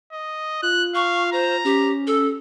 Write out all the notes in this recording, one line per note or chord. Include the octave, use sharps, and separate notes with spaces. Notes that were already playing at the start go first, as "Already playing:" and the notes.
D#5
F4 F#6
F5 C#6
C5 A#5
C#4 G4
A4